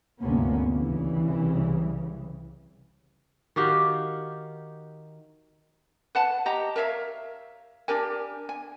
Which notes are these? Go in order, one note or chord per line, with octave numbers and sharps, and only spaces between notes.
G1 D2 C3 A#3 B3 C#4
C2 C#3 E3 G3
D#3 F#4 G4 F5
B4 F#5 A5
G4 D#5 A#5
A#4 C#5 E5 F5
D4 G4 A#4 G#5
G#5